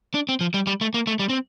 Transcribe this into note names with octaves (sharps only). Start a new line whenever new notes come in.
D4
C4
F3
G3
G3
A3
A#3
A3
G3
C4